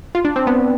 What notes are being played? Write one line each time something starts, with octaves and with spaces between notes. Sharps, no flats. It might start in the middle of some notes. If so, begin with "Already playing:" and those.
F4
D4
C4
B3